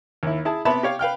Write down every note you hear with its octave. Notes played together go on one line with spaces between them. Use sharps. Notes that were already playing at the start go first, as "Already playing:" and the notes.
D#2 E4
E4 G#4 A5
C3 B3 E5 A5 B5
G4 C#5 F5
B4 F5 G5 F6